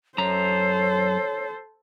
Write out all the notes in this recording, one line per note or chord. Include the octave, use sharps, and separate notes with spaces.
F#2 A4 C5 C#5 A#5